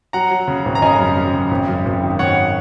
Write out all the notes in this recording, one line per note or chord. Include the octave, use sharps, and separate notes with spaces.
F#3 F#5 A#5
F#3
C#3
G#1
A#5
C#3 D#5 G#5
F#2
F#2
C#3
G#1
F#2
G#1
D#3
G#1 C#5 F#5